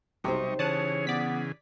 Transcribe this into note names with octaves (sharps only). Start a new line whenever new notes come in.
B1 C3 G3 D#4 G4 C5 D#5 C#6
C#3 E3 G#4 C#5 A5 D#6 F#6
B3 D5 B6